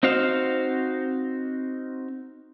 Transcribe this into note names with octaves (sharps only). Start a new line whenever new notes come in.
C4 D#4 F#4 C5 F5